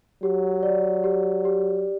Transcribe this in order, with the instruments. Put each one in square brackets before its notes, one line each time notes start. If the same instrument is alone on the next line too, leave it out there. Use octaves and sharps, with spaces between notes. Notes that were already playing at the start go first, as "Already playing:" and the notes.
[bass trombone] F#3 [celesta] G4
[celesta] D5
G4
G4